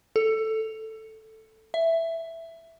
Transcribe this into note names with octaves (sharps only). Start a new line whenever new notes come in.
A4
E5